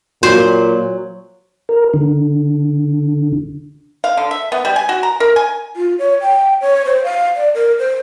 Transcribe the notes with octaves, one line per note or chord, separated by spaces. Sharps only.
A#2 F#3 C5
A#4
D3
F5
D3
E5
B3
G3
G#5
F#4
A#5
A#4
G#5
F4
C#5
G5
C#5
C5
F5
D5
A#4
C5